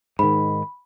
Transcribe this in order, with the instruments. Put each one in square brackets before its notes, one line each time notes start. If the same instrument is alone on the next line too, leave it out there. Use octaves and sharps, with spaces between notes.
[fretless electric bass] G#2 D#3 [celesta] B5